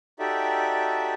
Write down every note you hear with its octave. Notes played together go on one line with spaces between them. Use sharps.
D#4 F#4 G4 A4 D5 E5